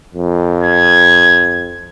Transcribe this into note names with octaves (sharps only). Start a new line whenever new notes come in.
F2
G#6